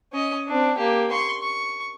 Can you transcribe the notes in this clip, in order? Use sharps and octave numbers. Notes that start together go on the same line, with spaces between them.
C#4 D#5
C4 D4
A#3 G4
C6 C#6
C#6